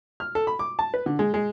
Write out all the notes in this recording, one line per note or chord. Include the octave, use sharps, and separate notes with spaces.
F6
A4
B5
D6
A5
B4
D3
G#3
G#3